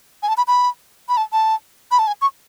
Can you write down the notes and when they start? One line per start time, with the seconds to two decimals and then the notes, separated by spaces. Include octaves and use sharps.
0.23 G#5
0.29 A5
0.37 B5
0.48 B5
1.09 B5
1.17 A5
1.33 A5
1.91 B5
1.99 A5
2.07 G#5
2.21 C#6